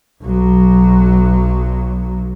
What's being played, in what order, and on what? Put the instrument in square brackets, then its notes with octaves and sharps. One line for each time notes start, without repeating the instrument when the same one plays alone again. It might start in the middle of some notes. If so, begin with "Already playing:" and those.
[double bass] B1 F#3